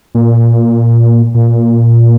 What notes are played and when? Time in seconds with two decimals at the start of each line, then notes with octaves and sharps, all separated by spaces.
0.15 A#2
1.34 A#2